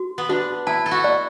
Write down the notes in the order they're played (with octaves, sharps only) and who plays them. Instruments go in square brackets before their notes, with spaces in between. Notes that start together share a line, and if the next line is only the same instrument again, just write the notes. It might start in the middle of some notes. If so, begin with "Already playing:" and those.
Already playing: [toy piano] F#4
[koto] B3
[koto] D4 [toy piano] F#4
[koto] E4 [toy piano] A5
[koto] A4
F#4
[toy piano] D5